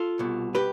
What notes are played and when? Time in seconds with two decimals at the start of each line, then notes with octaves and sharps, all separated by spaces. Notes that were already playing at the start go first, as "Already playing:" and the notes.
Already playing: F4 A4
0.19 C2 B2
0.55 G4 B4